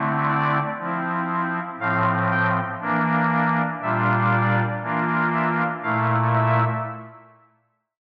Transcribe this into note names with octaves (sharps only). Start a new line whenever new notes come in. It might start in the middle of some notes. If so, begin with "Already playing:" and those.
Already playing: D3 A3 C4 E4
D5
F3 C4 E4
A2 F3 C4 F5
G5
E3 A#3 D4
A#2 G3 D4 F4 E5
D5
E3 A#3 D4 F4
E5
A#2 A3 E4 F5
E5